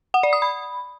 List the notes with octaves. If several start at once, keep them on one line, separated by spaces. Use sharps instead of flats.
F#5
D5
D#6
B5